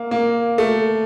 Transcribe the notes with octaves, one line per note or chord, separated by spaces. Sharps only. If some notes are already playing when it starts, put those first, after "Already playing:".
Already playing: A#3
A#3
A3